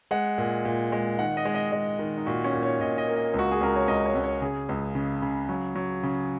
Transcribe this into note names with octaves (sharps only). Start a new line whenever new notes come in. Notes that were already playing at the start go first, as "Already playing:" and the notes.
G#3 F#5
A#2
A#2
G#3
D#3 F#5
D#5
G#3
D#5
G#3
D#3
D#4
A#2 F#4
C#4
A#2
C#5
A#2 D#5
D#5
A#3
D#5
C#2
F#4
G#4
C#2 A#4
C#5
C#2 D#5
C#5
C#2
C#5
C#3 G#4
C#2
C#3
C#3
F#3
F#3
C#3